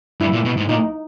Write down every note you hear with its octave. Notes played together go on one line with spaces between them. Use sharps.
G2 E4
A#2
B2
G#2
A#2 D#4